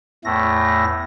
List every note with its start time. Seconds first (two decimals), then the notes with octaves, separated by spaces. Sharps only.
0.24 E2 A2 A3 A#6